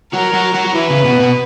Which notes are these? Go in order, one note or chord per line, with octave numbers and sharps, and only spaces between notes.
F#3 F#4 A#4
F#3 F#4
F#3 F#4
F#4
E3 E4 B4
C#3 C#4
B2 B3
B2 B3